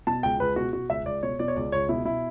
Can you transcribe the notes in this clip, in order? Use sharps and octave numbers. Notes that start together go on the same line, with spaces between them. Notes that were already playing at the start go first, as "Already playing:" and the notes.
B2 A5
C#2 G5
C#2 B4
B2 F#4
B2 F#4
C#2 E5
C#2 D5
B2 C#5
B2 D5
C#5
C#2 D5
C#2 C#5
B2 E4
B2 E4